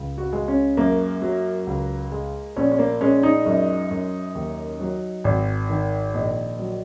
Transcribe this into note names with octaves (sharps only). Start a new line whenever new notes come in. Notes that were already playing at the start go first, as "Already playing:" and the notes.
Already playing: C#2
F#4
G#3
C#4
F#2 A#3
F#3
C#2
G#3
A#1 C#4
C#4
A#3
G#3 C#4
D#4
F#2
F#2
D#2
F#3
G#1
D#3
A#1 D#5
F#3